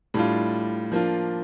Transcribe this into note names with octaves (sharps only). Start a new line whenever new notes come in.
A2 G3 D4 F4
F3 A#3 D4 F4